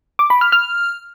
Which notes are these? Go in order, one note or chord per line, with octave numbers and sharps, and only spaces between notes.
D6
B5
F6
F6